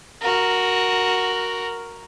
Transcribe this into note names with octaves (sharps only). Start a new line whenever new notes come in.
F#4 A#4